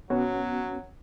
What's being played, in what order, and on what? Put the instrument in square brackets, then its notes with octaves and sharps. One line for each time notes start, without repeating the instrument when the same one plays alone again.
[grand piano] B2 C#5 [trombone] F#3 [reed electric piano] B3 C#4 F#4